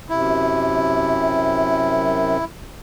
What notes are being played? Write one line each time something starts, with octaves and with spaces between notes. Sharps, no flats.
F#2 C3 E4